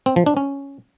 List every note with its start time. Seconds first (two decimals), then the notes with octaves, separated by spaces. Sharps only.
0.06 C4
0.16 F3
0.26 D4
0.37 C#4